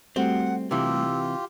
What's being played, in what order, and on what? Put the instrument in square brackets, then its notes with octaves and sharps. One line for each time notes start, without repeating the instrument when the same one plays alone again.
[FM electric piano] G3 A3 F#4 [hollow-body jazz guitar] C4 [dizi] F#5
[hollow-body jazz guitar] C3 E3 [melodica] F4 G4 [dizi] E6